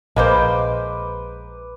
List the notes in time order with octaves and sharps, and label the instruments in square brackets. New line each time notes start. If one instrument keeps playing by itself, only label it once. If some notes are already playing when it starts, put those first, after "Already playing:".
[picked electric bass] A#1 [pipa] G#3 A#3 C5 [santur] B4 D6